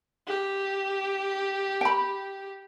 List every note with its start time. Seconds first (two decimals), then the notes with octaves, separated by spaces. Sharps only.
0.28 G4
1.81 G5 B5